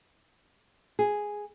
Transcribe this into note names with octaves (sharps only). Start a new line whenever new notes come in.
G#4